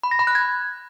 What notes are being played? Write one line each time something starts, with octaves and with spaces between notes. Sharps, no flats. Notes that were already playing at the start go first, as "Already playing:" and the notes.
B5
A#6
B5
F#6
G#6